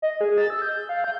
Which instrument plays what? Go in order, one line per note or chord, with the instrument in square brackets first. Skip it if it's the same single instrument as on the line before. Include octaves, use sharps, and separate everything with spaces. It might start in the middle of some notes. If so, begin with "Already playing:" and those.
[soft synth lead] D#5
G#4
A6
E6
G6
F5
G6